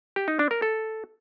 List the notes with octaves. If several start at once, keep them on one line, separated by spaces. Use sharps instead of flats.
G4
D#4
D4
A#4
A4